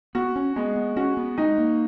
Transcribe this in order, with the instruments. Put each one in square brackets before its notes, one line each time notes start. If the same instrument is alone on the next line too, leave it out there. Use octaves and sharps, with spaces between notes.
[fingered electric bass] B3 [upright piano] F#4
[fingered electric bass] C#4
[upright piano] G#3 [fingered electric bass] B3
[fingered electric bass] B3
[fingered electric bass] C#4 [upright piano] F#4
[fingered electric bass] B3
[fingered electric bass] G#3 [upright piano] D#4
[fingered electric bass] A#3